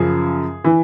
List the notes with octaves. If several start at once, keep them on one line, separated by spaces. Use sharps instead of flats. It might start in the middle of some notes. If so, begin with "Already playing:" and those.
Already playing: F#2 C#3 F3 G#4
E3